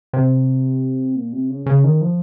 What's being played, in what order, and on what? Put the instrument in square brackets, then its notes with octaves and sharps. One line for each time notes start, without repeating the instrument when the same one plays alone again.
[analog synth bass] C3
A#2
C3
C#3
C#3
D#3
F3